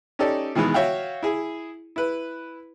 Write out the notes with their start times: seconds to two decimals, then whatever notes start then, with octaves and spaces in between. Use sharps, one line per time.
0.19 C#4 D#4 G4 A4 D5
0.55 B2 D#3 E3 G#3 B3
0.74 F#4 C#5 E5 F5 G5
1.23 E4 G#4
1.96 E4 B4